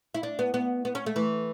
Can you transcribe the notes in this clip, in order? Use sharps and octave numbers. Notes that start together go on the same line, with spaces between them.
E4
D4
B3
B3
B3
C#4
A3
E3